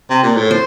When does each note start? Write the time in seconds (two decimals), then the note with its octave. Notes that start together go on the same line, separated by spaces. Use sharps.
0.10 C3
0.23 A#2
0.37 A2
0.51 C5